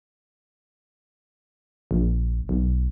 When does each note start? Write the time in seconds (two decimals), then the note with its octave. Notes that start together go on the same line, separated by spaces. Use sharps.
1.91 A#1
2.49 B1